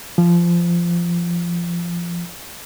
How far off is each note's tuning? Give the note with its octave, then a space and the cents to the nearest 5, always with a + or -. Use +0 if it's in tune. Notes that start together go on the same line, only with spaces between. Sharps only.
F3 -20